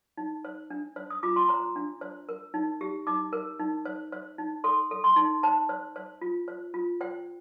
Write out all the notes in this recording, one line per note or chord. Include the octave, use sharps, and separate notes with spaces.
D#4
C5
D4
C5
D#6
F4 D6
C6
C5 A#5
D4
C5
A#4
D#4
G4
D#4 D6
A#4
D#4
C5
C5
D#4
A4 C6
A4
C6
D#4
C5 A5
C5
C5
F4
C5
F4
C5 G5